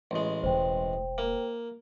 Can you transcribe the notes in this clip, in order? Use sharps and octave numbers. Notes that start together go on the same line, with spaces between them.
A1 G#3
E1 C5 G5
A#3